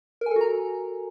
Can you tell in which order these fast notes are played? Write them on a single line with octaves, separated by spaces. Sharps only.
A#4 G#5 A4 F#4 A#5